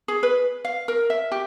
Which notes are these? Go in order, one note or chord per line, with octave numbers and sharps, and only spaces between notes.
G#4
B4
F5
A#4
E5
G4